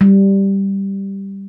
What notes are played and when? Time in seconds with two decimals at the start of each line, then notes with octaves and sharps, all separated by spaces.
0.01 G3